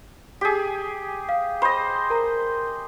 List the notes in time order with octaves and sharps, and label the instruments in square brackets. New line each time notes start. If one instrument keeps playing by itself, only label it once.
[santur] G4 G#4
[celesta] F5
[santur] C5 D#5 [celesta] B5
[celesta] A#4 A#5